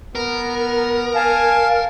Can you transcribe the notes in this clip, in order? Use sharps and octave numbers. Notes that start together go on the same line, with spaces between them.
B3 A#4
F5 G#5 A5